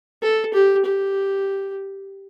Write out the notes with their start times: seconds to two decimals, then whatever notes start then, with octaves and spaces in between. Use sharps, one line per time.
0.23 A4
0.54 G4
0.85 G4